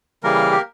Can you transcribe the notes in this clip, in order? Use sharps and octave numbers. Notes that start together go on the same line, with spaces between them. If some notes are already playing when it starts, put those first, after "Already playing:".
C#3 E3 G3 A#3 A#4
G4